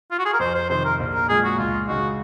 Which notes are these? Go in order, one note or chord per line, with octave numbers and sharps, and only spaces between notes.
F4
F#4
G#4
A#4
F2 C5
C5
C3 D#3 C5
A#4
A#1
A#4
A#2 G#3 G#4
F#4
C#2 F4
C#3 G#3 D#4 F#4